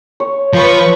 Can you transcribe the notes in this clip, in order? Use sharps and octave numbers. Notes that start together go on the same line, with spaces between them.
C#5
F3 B4 C#6